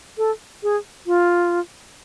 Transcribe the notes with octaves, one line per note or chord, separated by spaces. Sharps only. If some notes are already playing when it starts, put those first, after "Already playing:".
A4
G#4
F4